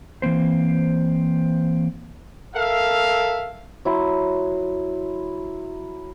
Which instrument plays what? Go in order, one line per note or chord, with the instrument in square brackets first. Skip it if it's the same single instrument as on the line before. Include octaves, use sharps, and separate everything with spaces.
[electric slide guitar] E3 A#3 C4 C5
[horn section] A4 A#4 E5 F5
[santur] F#3 E4 C6